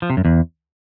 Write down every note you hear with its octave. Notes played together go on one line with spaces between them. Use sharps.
F3
C3
F#2
E2